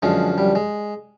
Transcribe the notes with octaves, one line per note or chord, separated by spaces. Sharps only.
F#2 D3 F3 G#3
G3
G#3